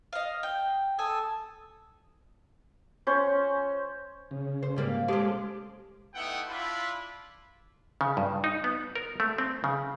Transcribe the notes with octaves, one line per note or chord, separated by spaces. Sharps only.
D#5 F5
G5
A4 G#5 D#6 E6
C#4 C5
C#3
C5
G#2 G3 A#3
G#3 C#4 G4 A4 C5 D6
A3 B3 D#4 E4 F#5 G5
D4 E4 F4 B5
C#3
G2
D#4
B3
A#4
A3
C4
C#3